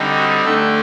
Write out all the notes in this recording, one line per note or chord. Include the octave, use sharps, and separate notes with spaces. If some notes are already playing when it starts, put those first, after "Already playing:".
Already playing: D3 G3 C4 D#4
F#4
D3 A3 D4 A4